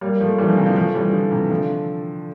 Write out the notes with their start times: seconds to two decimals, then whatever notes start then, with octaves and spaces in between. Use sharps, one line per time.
0.01 G3 A#3
0.21 F3 A3
0.38 E3 G3
0.48 D3 F3
0.57 C3 E3
0.66 D3 F3
0.76 F3 A3
0.95 E3 G3
1.12 D3 F3
1.31 C3 E3
1.50 D3 F3